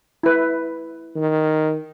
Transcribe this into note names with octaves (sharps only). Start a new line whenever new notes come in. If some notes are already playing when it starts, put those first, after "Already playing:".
E4 B4
D#3